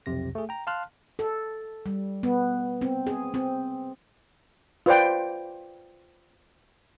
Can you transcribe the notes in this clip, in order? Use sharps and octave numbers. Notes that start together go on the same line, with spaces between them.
B1 F2 C3 A#6
A3 G#4
G5 A#5
F5 A5 C6 F6 F#6
A4
G3
B3
C4
G#4
C4
F4 B4 C5 D5 G5